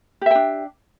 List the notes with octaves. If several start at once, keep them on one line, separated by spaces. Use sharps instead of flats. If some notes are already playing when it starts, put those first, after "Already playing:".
D4 G4 E5 G5